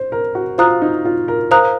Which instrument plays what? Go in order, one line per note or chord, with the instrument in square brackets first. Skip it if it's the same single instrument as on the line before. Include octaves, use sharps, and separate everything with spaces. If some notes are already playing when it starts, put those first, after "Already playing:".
Already playing: [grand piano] C5
A#4
F#4
[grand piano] F4 [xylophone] C5 F5 A#5 D#6 F#6
[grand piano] D#4
F4
A#4
[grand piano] A#4 [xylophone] C5 F5 A#5 D#6 F#6